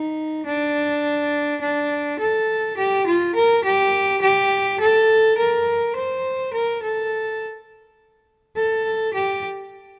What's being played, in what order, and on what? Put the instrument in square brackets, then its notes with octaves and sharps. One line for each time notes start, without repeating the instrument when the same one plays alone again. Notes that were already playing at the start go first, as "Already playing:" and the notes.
Already playing: [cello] D#4
D4
D4
A4
G4
F4
A#4
G4
G4
A4
A#4
C5
A#4
A4
A4
G4